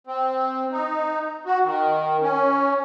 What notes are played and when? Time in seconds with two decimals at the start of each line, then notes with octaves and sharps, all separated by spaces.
0.07 C4
0.72 D#4
1.46 F#4
1.64 D#3
2.22 C#4